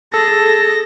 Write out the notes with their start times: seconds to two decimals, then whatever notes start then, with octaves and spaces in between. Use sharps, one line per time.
0.14 G#4 A4 A5 A#6